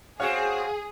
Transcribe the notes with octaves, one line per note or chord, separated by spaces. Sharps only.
C4 F#4 G#4 C#5 F5 F#5